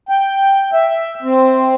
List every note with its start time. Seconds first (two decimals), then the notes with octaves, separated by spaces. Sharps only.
0.09 G5
0.73 E5
1.22 C4